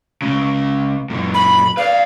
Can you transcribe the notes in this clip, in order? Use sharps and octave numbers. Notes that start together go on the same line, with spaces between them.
C#2 C#3
F#2 A#2
B5
B4 D5 F5